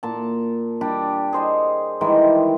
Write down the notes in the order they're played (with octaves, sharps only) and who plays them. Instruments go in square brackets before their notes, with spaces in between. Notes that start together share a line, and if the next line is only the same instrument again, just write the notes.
[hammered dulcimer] A#2 A5
G3 D4 G4
G#4 C5 D#5
D#3 E3 G3 G#3